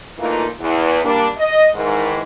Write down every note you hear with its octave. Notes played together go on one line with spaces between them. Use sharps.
A#2 E3 A3 A#3 D#4 F4
E2
G3 A#3 D4
D#5
G#2 D#3 E3